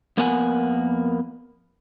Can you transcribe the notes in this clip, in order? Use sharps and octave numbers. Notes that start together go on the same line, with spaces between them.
F2 A#3 B3 A#4 F#5 G#5